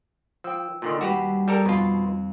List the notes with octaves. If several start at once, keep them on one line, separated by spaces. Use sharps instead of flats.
F3 G5 E6
A#2 D3 D#3
D#2 G3 F#4 G4 B4 C7
G3 A4 A#4
F2 B2 F4 C7